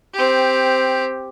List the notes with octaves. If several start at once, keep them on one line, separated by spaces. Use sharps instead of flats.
C4 G4